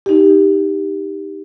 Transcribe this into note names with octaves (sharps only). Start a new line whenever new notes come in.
D#4 G4